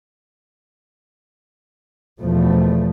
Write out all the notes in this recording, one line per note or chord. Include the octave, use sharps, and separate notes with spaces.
E2 B2 F3 A3